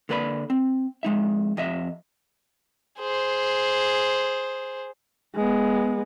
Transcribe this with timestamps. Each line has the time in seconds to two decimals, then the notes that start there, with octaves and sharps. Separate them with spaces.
0.09 D3 A#3 B4 D5 B5
0.50 C4
1.03 F2 G#3 D#4 E5
1.57 F2 D#5 E5
3.00 G#4 C5
5.35 G#3 B3